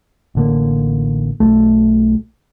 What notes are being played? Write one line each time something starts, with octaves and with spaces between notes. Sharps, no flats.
A1 D3 A#3
B1 A3